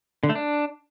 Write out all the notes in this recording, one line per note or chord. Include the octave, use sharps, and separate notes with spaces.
D3
A3
D4